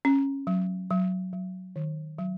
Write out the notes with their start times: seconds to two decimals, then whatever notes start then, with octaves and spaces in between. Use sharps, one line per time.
0.05 C#4
0.47 F#3
0.90 F#3
1.33 F#3
1.76 D#3
2.18 F#3